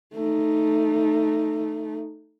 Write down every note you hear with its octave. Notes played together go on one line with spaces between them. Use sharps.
A3 D#4